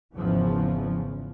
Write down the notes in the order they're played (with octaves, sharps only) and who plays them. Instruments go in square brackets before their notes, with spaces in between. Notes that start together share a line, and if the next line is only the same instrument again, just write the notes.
[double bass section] G#1 E2 C#3 E3 F3